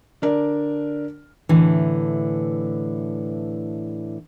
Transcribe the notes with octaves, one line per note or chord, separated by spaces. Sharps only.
D3 D4 A#4 D5
A2 D3 E3